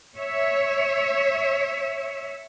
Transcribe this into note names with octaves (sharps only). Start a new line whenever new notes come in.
C#5 E5